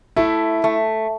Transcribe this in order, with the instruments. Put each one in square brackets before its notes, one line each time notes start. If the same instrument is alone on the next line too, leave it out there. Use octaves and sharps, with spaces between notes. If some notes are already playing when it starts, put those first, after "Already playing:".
[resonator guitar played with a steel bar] A3 [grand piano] E4
[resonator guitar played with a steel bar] A3